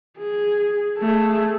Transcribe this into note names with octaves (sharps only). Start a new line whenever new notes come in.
G#4
A3 G#4